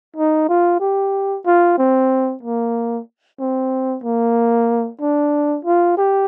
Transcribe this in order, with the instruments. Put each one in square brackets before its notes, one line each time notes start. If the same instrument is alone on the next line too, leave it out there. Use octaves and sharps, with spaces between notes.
[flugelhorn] D#4
F4
G4
F4
C4
A#3
C4
A#3
D4
F4
G4